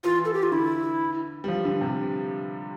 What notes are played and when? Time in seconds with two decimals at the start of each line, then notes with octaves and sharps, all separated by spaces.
0.04 E3 F4
0.25 A4
0.34 G4
0.43 F4
0.51 D3 E4
1.44 G3
1.48 F3
1.65 D3
1.81 C3